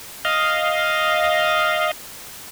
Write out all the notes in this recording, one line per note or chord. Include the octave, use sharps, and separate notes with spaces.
D#5 F5